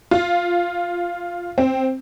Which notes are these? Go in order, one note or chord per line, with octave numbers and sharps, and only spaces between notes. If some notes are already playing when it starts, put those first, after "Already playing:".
F4
C4